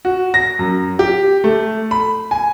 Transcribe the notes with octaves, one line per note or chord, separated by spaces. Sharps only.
F#4
A#6
F#2
G4
A3
B5
G#5